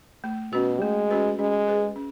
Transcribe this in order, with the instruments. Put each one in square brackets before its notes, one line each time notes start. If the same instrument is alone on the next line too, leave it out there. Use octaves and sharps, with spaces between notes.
[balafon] A3
[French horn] B2 [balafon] C#4 F#4 B4
[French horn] G#3 [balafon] A3
[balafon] C#4 F#4 B4
[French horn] G#3 [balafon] C#4
[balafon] G#4 B4
C#4